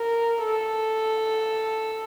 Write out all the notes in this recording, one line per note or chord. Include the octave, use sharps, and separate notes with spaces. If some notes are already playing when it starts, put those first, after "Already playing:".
Already playing: A#4
A4